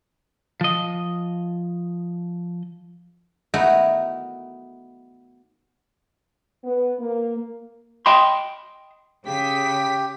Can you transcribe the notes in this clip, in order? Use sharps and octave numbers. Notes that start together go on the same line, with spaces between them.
F3 D#5
A3 B3 D#4 E4 F#4 A#4
B3
A#3
D#5 G5 B5 C6
C#3 G4 B6